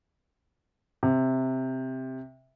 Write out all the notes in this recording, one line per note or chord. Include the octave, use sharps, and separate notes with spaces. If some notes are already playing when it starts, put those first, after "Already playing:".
C3